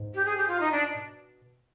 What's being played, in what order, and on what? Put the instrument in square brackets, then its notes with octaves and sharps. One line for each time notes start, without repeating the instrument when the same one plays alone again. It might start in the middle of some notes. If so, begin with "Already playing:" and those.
Already playing: [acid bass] G#2
[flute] G4
G#4
G4
F4
D#4
D4
[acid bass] B2